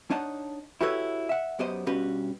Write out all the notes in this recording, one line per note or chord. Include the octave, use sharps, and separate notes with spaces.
D4 D#4 C#5 D#5 F#5 A5
E4 F#4 G4 A4 B4 C#5
E5 F#5
F#2 B3 G4 C5 D#5
G2 B2 C#4 F#4 G4 B4